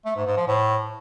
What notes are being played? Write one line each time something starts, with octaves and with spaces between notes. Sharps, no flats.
A3
G#2
G#2
F3
A2